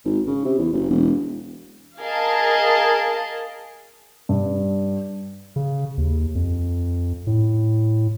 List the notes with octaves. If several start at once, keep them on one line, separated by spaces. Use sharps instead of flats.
G#1
C#3
C3
E2
F#1
E1
G#4 A#4 D#5 F5 A5
G2
C#3
D#2
F2
A2